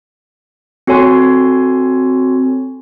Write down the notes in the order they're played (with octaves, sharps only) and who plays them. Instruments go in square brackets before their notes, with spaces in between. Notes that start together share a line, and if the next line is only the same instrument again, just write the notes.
[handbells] C4 F#4 A4 C#5 G#5 C6